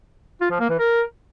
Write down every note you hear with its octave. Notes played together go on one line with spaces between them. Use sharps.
F4
F3
A#3
E3
A#4